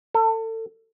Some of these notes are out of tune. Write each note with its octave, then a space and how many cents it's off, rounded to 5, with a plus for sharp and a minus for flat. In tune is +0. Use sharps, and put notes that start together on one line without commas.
A4 +30